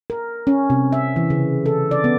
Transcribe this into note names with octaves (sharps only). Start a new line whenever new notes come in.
A#4
C#4
C3
E5
E3
C#3
A4
D5
B3